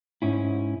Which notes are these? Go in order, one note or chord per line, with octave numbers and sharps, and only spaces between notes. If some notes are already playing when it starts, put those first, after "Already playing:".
G#2 C#4 E4